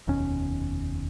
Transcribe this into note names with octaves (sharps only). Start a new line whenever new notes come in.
F1 D#2 B2 C#4